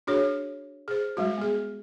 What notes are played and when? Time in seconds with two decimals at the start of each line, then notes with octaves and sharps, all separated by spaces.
0.07 D4 F#4 G#4 C#5
0.88 G#4 C5
1.17 G3 G#3 F#4
1.38 B3 G#4